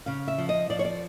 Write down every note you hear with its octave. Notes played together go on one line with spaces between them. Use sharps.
C#3 F5
E5
F3
D#5
F3 D5
C#5
D5